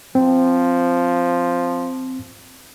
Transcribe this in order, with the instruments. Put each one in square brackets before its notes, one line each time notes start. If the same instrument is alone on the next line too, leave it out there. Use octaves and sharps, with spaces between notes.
[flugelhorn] F3 [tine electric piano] C4